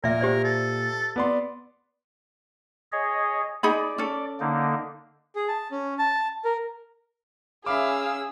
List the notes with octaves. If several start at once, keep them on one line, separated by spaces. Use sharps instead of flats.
A#2 A#4 D5 E5
G4 C5 D5
A4
B3 D5 C6
G#4 C#5 D#5
D#4 G#4 D5 B5
C#4 A4
D3 A#3 D#4
G#4
A5
C#4
A5
A#4
C#4 G#4 E5 F5 B5 D6 E6